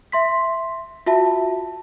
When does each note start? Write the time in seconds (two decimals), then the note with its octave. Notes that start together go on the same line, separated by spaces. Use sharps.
0.12 E5 C6 B6
1.06 F4 F#4 E5 A5